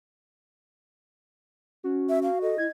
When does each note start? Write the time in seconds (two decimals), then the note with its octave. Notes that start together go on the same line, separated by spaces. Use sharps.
1.84 C#4 F#4
2.09 E5
2.23 F5
2.42 A4 D#5
2.58 E4 G#6